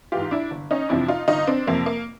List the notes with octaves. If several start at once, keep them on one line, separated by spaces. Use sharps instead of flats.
G#2 E3 F4 G4
D4 E4
G1
C#4 D#4
F2 C3 F3 D4 E4
D#4 F4
G1 D#4 F4
C4 D4
F2 C3 F3 A#3 C4
A#3